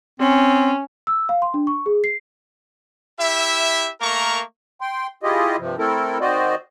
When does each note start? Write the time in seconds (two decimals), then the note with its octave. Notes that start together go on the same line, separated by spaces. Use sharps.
0.20 C4 C#4
1.07 E6
1.29 F5
1.42 C6
1.54 D4
1.67 C#6
1.86 G#4
2.04 C7
3.19 E4 G4 E5
4.01 A3 A#3 A#4 A#5 C#6
4.81 G5 C6
5.23 E4 F4 G4 G#4 D#5
5.59 G2 C3 F3
5.78 A3 C4 E4 A4 A#4
6.21 D#3 C4 F#4 C5 D5 D#5